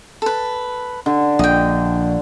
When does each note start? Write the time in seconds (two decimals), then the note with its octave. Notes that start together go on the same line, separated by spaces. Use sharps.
0.22 A4 B4
1.06 D3
1.39 A#1 D#5 G5